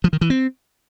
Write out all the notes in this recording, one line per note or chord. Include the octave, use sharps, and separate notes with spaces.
F3
D#3
E3
C4